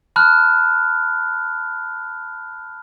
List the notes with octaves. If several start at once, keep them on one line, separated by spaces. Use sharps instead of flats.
A5 B5 F6 F#6